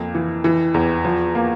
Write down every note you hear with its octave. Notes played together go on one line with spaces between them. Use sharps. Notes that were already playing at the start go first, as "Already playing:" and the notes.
Already playing: F2 A#3
E3
E3
E2
F3
A#3